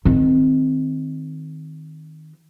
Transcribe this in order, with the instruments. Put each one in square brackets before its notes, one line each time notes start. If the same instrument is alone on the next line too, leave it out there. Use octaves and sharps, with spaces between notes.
[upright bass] D#3 C4